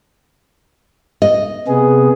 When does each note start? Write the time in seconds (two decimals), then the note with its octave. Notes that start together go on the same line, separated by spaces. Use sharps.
1.22 D#5
1.68 C3 B3 G#4